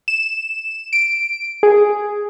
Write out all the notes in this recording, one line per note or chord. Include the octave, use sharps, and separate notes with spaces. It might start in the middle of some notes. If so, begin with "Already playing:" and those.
E7
D7
G#4